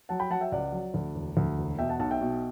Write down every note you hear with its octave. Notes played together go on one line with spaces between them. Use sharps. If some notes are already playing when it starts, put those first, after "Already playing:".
F#3 F#5 A5
G5 B5
F#3 F#5 A5
E5 G5
C#2 D5 F#5
F#3
D2
E1
D2
E1
B2 E5 G5
F#5 A5
B1 F#5 A5
E5 G5
B2